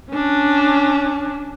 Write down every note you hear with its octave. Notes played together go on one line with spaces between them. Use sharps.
C#4 D4